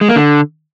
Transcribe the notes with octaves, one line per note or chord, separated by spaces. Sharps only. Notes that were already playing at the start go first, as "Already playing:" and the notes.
G#3
A#3
D3